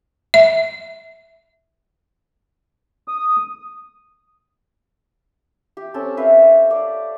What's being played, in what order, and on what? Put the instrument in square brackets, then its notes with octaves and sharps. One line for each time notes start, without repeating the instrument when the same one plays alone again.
[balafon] E5
[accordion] D#6
[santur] G4
C4 C#4 A4 A5
B4 E5 F5
C5
D5